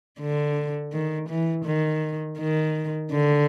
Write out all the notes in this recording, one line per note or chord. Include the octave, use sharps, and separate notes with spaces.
D3
D#3
E3
D#3
D#3
D3